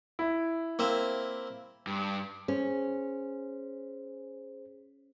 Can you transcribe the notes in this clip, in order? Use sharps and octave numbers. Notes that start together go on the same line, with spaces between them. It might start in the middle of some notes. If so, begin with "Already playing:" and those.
E4
A#3 C4 E5
G2
C#4 G#4 C5